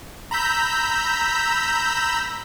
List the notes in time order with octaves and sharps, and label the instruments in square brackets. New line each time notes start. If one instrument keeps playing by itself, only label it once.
[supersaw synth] A#5 B5 E6 G6 B6